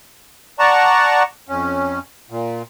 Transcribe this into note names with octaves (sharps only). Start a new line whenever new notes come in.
D5 F#5 A5 A#5 C#6
F2 C#4
A#2